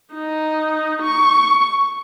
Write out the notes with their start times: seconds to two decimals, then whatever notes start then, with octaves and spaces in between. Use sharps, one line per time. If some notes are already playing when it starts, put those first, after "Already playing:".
0.13 D#4
1.02 C#6